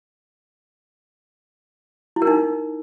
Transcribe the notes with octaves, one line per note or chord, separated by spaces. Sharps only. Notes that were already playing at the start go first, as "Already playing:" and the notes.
E4
A#4
D#4